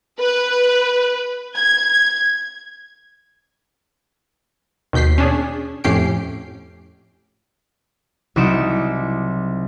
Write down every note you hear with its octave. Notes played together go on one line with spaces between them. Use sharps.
B4
G#6
D#2 B2 G6 B6 C7
C#4 D4 G#4
F2 A2 C#4 G4 C7 D7
C2 F#3 D#4 D6 C#7 E7